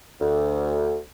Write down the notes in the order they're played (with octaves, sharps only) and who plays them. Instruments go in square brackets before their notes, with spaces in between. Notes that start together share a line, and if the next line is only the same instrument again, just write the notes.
[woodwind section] D2